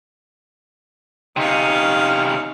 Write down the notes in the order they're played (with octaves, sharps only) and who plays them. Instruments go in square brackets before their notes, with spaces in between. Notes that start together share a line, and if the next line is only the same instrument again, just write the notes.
[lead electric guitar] C3 C#4 [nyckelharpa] D#4 F5